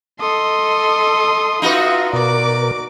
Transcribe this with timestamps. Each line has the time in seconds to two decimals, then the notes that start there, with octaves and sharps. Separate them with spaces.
0.20 A4 D#5 C6 D#6
1.62 D#4 F4 F#4 B4 E5
2.13 B2 A#4 D5 D6